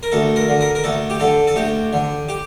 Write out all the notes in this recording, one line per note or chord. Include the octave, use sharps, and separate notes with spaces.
A#4
D2 A4
A#4
D3
A#4
A#4
D2 A4
G4
D3 A4
A4
D2 G4
D3
G4